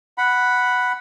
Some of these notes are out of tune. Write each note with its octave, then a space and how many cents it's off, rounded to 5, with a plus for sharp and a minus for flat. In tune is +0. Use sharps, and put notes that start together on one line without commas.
F#5 +0 B5 +0